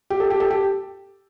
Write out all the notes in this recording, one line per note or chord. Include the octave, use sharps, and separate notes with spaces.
G4
A4
G4
A4
G4